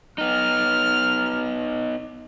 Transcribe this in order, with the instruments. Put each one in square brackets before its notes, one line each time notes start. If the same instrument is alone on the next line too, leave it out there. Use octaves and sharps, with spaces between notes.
[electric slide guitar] B3 D#4 [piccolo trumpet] F6